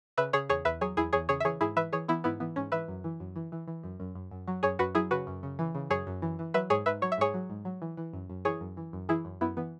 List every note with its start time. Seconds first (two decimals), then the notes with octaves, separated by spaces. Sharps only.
0.18 C#3 B4 E5
0.33 C#3 G#4 C#5
0.49 E2 G#4 C#5
0.65 E2 B4 E5
0.81 F#3 G#4 C#5
0.97 E2 E4 G#4
1.13 E2 G#4 C#5
1.29 C#3 G#4 C#5
1.40 E5
1.44 E3 G#4 C#5
1.61 G#2 E4 G#4
1.76 E3 B4 E5
1.93 E3 G#4 C#5
2.08 E3 B3 E4
2.24 G#2 B3 E4
2.40 E3 B3
2.56 G#2 C#4
2.72 E3 B4 E5
2.88 F#2
3.04 E3
3.20 F#2
3.36 E3
3.52 E3
3.68 E3
3.83 F#2
4.00 F#2
4.15 F#2
4.31 F#2
4.48 F#3
4.63 F#2 G#4 C#5
4.79 F#2 F#4 B4
4.95 F#3 E4 G#4
5.11 C#3 F#4 B4
5.27 F#2
5.43 C#3
5.59 E3
5.75 C#3
5.90 F#2 G#4 C#5
6.07 F#2
6.22 E3
6.39 E3
6.54 F#3 B4 E5
6.70 G#2 G#4 C#5
6.86 G#2 B4 E5
7.02 F#3 C#5
7.12 E5
7.18 G#2 G#4 C#5
7.34 F#3
7.50 G#2
7.65 F#3
7.82 E3
7.97 E3
8.14 F#2
8.30 F#2
8.45 E3 G#4 C#5
8.61 F#2
8.77 E3
8.93 F#2
9.09 E3 E4 G#4
9.25 F#2
9.41 F#2 B3 E4
9.57 E3 B3